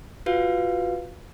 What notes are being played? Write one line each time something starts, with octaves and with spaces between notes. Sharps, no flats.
F4 F#4 B4 F5